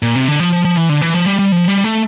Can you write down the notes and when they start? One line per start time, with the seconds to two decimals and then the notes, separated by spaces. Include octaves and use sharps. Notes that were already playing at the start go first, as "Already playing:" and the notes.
0.02 A#2
0.15 C3
0.28 D3
0.40 F3
0.53 F3
0.65 F3
0.77 E3
0.89 D3
1.01 E3
1.14 F3
1.26 G3
1.39 G3
1.52 F3
1.68 G3
1.84 A3